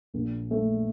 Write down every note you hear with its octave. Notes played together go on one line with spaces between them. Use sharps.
A#1 A#2 A#3
A3